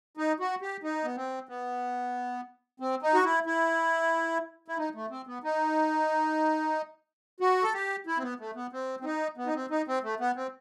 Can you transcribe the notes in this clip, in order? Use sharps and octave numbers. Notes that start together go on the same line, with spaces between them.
D#4
F#4
G4
D#4
B3
C4
B3
C4
D#4
F#4
E4
E4
E4
D#4
A3
C4
B3
D#4
F#4
A4
G4
E4
C4
B3
A3
B3
C4
C4
D#4
B3
D#4
C4
D#4
C4
A3
B3
C4